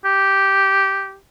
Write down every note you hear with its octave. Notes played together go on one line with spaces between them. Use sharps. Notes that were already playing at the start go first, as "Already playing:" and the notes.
G4